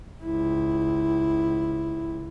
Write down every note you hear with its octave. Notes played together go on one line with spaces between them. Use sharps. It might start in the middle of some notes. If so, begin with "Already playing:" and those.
C#2 E4